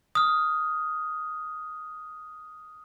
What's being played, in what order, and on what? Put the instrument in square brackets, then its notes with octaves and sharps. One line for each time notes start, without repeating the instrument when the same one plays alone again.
[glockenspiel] D#6 F6